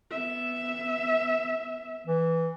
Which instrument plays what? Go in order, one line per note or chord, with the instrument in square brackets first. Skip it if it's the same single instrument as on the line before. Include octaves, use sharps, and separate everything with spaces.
[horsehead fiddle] B3 E5
[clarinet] E3